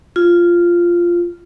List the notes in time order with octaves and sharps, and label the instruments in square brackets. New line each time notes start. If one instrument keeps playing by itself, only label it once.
[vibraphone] F4